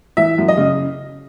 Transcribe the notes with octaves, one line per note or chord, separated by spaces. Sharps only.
E3 E5
F#2
D#5
C#3